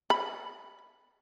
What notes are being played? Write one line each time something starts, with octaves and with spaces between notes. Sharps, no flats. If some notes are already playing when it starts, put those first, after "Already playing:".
B5